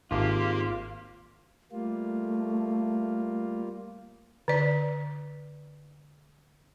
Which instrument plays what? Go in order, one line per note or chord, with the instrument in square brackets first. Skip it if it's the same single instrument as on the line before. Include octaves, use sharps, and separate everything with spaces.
[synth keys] G#1 [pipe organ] A#3 G4 [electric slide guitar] F4
[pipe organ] G3 A#3 F4 [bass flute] A3
[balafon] D3 D5